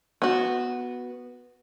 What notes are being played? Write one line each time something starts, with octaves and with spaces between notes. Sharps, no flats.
B3 F#4